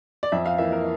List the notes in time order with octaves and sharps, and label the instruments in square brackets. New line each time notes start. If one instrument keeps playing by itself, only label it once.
[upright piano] D5
F2 E5
F5
E3 A#3 E5
A#4